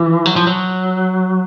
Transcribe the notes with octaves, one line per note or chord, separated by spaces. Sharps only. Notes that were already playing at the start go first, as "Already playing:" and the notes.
Already playing: E3
F#3
F3
F#3